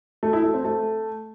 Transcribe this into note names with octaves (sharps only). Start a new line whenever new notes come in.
A3
E4
A3
C4
A3